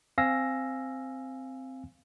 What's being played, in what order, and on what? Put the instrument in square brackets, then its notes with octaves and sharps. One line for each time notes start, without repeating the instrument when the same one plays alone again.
[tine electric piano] C4 F5 G#5 E6 A#6